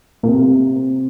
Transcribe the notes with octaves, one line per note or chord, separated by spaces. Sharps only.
A#2
C3